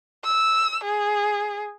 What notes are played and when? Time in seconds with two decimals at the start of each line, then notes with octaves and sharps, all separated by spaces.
0.24 E6
0.84 G#4